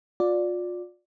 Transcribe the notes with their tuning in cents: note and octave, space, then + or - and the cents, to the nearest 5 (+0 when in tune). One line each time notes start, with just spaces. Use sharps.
F4 +35 D5 +0